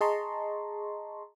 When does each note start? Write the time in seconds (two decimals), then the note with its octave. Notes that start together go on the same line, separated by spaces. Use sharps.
0.01 G#4 D#5 A5 A#5 C6 C#6